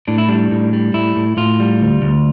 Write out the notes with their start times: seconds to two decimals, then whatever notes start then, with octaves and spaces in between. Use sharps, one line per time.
0.08 A2 D4
0.18 E4
0.29 G3 D4
0.51 A2
0.73 G3
0.94 A2 E4
1.16 A2
1.37 A2 F4
1.60 G3
1.81 D2
2.02 D2